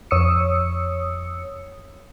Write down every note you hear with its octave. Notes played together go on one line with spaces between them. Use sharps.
F2 C#5 D#6 E6 C#7